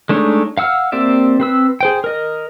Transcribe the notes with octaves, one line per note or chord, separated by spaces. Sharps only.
G#3 A3 D4 D#4 C#5
F5 F#5 E6 F6
A#3 C4 G4 D5 E5
C4 B4 E6
G#4 C5 G5
A#4 D#5